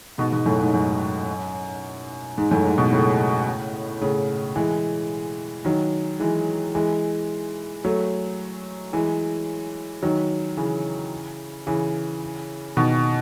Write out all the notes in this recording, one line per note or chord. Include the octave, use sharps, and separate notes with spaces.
G#2 B2
G#2 B2
F#2 A2
G#2
F#2
G#2
F#2 A2
G#2
G#2 B2
A2 C#3
A2 C#3
E3 G#3
D#3 F#3
E3 G#3
E3 G#3
F#3 A3
E3 G#3
D#3 F#3
C#3 E3
C#3 E3
B2 D#3